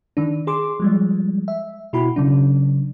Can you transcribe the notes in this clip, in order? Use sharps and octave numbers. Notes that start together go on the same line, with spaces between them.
D#3 D4
G#4 C6 D6
F3 G3 G#3
E5
B2 E4 F#4 B5
C#3 F#3 D4